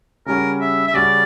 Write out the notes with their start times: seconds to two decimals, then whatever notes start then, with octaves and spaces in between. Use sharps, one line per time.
0.26 C#3 G3 C#4 F#4 A#4
0.61 E5
0.87 E5
0.94 C#3 G3 C#4 F#4 D5